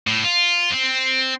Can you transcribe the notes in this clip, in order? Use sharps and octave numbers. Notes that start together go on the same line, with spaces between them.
A2
F4
C4